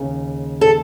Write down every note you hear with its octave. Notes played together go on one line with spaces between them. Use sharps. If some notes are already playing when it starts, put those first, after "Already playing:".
Already playing: D#2 C#3
A4